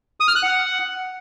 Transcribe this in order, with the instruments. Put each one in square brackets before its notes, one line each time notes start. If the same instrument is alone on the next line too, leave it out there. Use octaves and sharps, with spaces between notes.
[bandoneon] D#6
F6
F#6
F#5